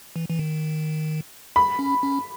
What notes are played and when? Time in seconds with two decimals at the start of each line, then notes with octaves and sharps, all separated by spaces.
0.16 E3
0.29 E3
0.39 D#3
1.56 B5
1.79 C#4
2.03 C#4